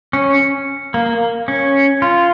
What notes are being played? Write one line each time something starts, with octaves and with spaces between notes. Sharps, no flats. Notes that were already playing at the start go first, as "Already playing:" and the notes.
C#4
A#3
C#4
F4